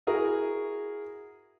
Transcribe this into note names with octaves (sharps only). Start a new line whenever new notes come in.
E4 F#4 G#4 A#4